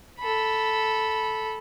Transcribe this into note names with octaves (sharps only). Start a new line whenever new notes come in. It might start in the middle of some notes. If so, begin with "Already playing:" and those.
A4 B5